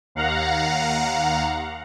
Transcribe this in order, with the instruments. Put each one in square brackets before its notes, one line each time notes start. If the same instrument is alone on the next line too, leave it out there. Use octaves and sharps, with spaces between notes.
[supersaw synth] D#2 F5 F#5 A#5